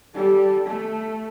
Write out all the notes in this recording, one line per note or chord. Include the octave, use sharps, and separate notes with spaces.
G3 A4
A3